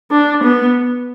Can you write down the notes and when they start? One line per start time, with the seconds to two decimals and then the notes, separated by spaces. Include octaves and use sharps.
0.11 D4
0.44 B3